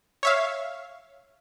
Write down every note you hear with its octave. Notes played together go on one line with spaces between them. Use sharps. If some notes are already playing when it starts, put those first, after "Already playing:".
C#5 E5 F5